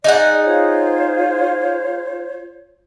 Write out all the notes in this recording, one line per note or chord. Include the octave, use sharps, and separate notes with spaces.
D#4 G#4 D5 F#5
F4 C5 C#5